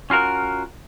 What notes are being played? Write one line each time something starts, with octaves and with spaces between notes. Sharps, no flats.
C#4 F4 F#4 A#4